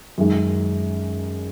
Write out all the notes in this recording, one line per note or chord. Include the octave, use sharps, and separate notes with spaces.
F#2 D#3 G#3